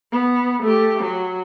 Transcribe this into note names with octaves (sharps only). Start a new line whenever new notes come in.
B3
A3 G4
F#3